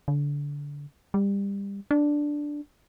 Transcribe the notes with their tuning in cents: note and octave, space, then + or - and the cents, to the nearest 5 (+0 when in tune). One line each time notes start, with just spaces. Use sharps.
D3 -25
G3 +25
D4 +0